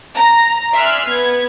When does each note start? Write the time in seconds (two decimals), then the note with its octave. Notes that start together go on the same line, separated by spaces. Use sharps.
0.16 A#5
0.75 D5 E5 G#5 C6 F6 F#6
1.07 B3 G#6